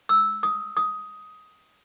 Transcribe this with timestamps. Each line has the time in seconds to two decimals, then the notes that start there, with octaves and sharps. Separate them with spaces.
0.09 E6
0.43 D#6
0.77 D#6